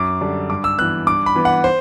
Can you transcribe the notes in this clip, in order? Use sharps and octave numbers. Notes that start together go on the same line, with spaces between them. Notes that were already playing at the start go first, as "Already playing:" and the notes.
Already playing: F#2 D6
D3 G3 D4
G2 D6
E6
E3 B3 F#6
G2 D6
B5
E3 B3
F#5
C5